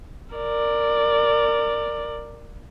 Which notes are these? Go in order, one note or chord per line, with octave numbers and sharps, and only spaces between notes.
A#4 D5